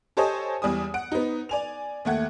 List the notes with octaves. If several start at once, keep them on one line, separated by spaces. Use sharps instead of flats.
G4 A4 C5 C#5 D#5 G#5
E2 G3 G#5 D#6
F#5 D7
B3 D#4
D5 G#5 F7
D#2 A3 F#5 G#6